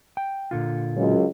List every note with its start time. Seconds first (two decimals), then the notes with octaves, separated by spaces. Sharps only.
0.17 G5
0.51 A#2 D3 F4
0.96 C#2 F#2